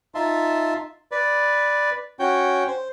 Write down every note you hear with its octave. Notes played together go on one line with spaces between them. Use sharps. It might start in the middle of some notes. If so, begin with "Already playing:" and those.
D#4 F4 E5 A5 C6
B4 D5
C#4 F#4 C#5 G5
C5